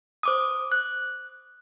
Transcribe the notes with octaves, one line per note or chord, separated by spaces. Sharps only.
C5 D6 D#6
F#6